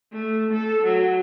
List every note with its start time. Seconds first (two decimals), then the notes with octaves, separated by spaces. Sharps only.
0.12 A3
0.53 A4
0.83 F#3